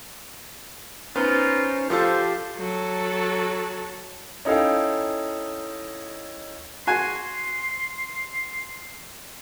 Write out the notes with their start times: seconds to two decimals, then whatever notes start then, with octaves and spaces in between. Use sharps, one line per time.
1.16 B3 C#4 D#4 F4 C5
1.90 F3 F4 G4 A4 C5
2.57 F#3 A4
4.45 C#4 D#4 E4 A4 F5 G5
6.87 F#4 G#5 C6